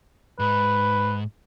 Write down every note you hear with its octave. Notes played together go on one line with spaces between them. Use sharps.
G#2 B4